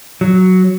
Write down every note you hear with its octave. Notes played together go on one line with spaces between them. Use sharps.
F#3